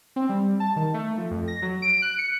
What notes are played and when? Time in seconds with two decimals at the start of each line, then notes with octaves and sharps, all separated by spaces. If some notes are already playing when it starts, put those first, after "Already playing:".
0.16 C4
0.29 G3
0.60 A5
0.76 D#3
0.94 A3
1.17 F3
1.31 F2
1.48 A#6
1.62 F#3
1.82 D7
2.02 F#6
2.18 C#7